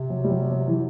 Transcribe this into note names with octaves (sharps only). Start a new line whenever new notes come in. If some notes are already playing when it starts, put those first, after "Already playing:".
Already playing: C3
F#3
G3
F#3
F#3
E3